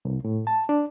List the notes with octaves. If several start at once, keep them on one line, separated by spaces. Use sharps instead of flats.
C2
A2
A5
D4